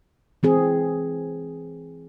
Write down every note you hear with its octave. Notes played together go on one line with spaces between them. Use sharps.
E3 C4 G#4